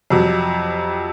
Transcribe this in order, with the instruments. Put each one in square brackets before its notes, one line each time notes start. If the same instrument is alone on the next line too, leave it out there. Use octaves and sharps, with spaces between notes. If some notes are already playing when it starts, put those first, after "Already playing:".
[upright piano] F2 C3 F#3